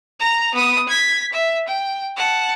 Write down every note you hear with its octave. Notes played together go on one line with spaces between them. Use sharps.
A#5 F7
B3 D#6
G#6 B6
E5
G5
F#5 A5